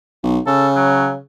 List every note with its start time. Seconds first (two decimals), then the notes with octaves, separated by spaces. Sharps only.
0.23 B1
0.47 C#3 A4
0.75 F#3